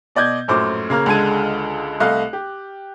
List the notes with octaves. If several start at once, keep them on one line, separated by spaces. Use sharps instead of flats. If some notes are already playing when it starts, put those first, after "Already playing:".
B2 D5 D#5 G6 G#6
A#1 F#2 A2 C5 D6
C#3 A#3 A#5 F6
C#2 D3 G#3 A5 G#6 D#7
C2 A3 D#5 F5 F#6
G4